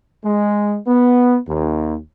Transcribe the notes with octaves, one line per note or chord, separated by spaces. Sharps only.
G#3
B3
D#2